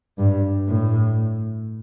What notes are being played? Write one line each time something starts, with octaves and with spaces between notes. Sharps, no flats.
G2
A2